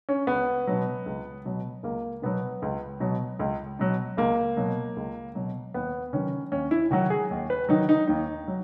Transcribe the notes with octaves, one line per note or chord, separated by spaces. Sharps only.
C#4
C#2 B3
B2 F#3
C#2
B2 F#3
C#2 A#3
B2 F#3 B3
C#2
B2 F#3
C#2
B2 F#3
C#2 A#3
B2 F#3
C#2
B2 F#3
D#2 B3
D#3 F#3 C#4
D#2 C#4
E4
D#3 F#3 F#4
G#4
D#2
B4
D#3 F#3 D#4
D#4
D#2 D#4
F#3